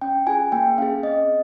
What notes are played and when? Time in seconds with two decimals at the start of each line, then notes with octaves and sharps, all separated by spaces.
0.01 C#4 G5
0.27 F4 G#4 G#5
0.52 A#3 G5
0.78 C#4 G#4 F5
1.03 C4 D#5